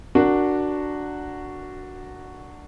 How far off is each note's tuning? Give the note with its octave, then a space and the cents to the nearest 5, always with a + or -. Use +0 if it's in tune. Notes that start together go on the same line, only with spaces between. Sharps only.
D4 +0 F#4 +0 A#4 -15